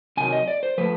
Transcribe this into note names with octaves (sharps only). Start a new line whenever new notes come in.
C3 D#3 F#3 G#5
D#5
D5
C5
F3 A3 B4